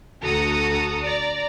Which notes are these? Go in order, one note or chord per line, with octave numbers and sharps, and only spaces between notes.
D2 F#4 A4 A#5 D#6 C#7
D5 A#5